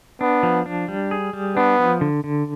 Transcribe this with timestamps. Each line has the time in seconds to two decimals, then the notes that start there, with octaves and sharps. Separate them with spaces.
0.21 B3 D4
0.43 F3
0.66 D4
0.88 G3
1.11 G#4
1.33 G3
1.56 B3 D4
1.79 F3
2.01 D3
2.24 D3